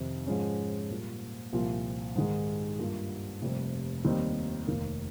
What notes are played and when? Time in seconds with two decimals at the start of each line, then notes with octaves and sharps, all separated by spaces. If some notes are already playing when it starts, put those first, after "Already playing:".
Already playing: F2 C3 D#3
0.27 G#2 F3 G#3 C#4
0.90 A#2 G3 A#3 F4
1.52 C2 A#2 F3 A#3 F4
2.15 G#2 D#3 G#3
2.79 G2 G3 A#3 F4
3.42 F1 F2 C3 G3 A#3
4.05 D#2 D#3 G3 C4 D#4
4.67 F1 D#2 D#3 A#3